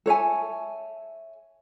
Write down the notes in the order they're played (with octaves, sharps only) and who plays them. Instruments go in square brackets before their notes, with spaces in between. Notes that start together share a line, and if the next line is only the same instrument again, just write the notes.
[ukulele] A4 C#5 E5 G#5